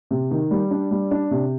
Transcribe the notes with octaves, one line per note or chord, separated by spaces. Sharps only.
C3
D#3
G3
D4
G3
D4
C3